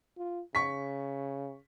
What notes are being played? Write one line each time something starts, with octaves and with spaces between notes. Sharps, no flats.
F4
C#3 C#6 B6